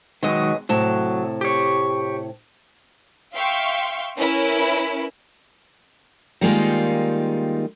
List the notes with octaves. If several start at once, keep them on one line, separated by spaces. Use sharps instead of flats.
B2 D#3 F#3 G#3 D#5
A2 C3 F#3 A5
G4 C#5
E5 F5 G5 C6 C#6
C#4 E4 A#4 B4
D#3 G3 G#3 A#3 D#4 F4